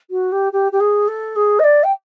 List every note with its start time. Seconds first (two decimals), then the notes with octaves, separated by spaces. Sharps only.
0.10 F#4
0.32 G4
0.52 G4
0.72 G4
0.80 G#4
1.07 A4
1.36 G#4
1.59 D#5
1.64 D5
1.83 G5